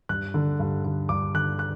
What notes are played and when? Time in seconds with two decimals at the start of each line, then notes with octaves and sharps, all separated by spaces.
0.09 G2 F#6
0.34 D3
0.60 G2
0.85 D3
1.09 G2 D6
1.34 D3 F#6
1.59 F#6